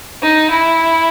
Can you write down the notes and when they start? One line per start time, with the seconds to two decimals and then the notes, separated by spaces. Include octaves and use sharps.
0.23 D#4
0.51 E4